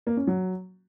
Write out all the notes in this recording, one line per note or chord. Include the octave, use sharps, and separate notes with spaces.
A#3
C#4
F#3